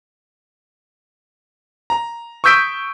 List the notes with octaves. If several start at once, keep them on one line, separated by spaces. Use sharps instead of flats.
A#5
C#6 D#6 E6 G6 B6 D7